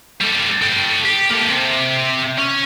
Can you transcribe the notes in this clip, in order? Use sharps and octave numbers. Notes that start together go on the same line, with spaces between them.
G3 A4
A4 G5
G4
A#3 A4
C3
C#4